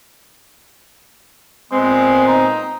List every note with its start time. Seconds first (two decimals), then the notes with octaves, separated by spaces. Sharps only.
1.72 A#2 G#3 B3 C4
2.27 D#4